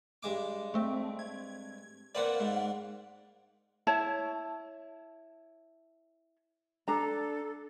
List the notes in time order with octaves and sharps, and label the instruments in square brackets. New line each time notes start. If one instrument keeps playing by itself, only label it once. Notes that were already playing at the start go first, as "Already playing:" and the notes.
[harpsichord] G2 G#3 D6
[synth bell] A3 C4
G#6
[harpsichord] A#3 C4 B4 [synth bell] D5 F5 F#5
[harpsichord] G#2
[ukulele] E4 C#5 A5
[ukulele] D4 A#5 [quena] A4